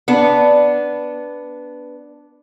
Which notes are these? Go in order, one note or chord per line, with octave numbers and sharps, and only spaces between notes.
B3 D4